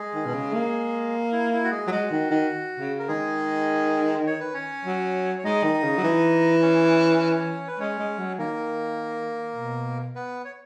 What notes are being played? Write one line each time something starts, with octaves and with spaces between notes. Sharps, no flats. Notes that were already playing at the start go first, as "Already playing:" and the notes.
Already playing: G#3 G#4
D#3
B2
C#3
A#3
E4
E4
F#4
G#3 G#4
F#3
G#3 F#4
D#3
D#3
C#3
A#4
D#3 G#3 G#4
C#5
B4
C#4 C#5
F#3
C#5
G#3 D#4 D#5
D#3
C#3
F#3
E3
C#4 C#5
B4
G#3 C#4 C#5
G#3
F#3
D#3 A#3 A#4
B2
B3 B4
C#5